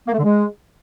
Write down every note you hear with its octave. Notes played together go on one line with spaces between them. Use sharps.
A#3
A3
D3
G#3